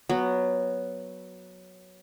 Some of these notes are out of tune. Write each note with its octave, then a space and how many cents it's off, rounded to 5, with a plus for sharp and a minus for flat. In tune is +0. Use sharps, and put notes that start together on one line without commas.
F#3 +0 B3 +0